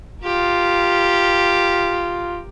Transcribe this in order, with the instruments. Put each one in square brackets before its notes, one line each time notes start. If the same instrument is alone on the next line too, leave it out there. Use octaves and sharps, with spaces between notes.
[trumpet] F4 [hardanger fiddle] G4 A#4